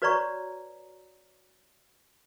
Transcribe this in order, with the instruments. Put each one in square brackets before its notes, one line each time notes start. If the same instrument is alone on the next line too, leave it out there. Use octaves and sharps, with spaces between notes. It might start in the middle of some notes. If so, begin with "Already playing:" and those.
[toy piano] F#4 B4 C#5 D5 A#5 C#6